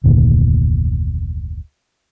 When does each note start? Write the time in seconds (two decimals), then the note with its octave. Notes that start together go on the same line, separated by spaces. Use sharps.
0.04 F1 D2 A#2 D#3